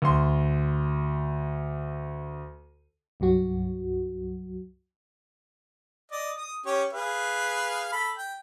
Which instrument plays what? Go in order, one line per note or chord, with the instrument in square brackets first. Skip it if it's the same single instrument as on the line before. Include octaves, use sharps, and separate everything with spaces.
[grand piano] D2 C6
[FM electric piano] C2 G2 F#3 F#4
[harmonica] D5 D#5
D#6
C#4 G4 C#5
G#4 B4 F5
A4 B5
G5